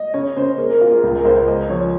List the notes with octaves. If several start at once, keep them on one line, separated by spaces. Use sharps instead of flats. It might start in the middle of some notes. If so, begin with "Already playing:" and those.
Already playing: D#5
C#3 C#5
C#3 C5
A#3 G#4
A#4
A#3 F4
G#4
C#2
A#4
C#2 C5
G#3 D#5
F3 C#5